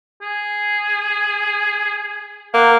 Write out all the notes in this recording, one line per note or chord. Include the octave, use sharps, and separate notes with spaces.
G#4
A#3 F#5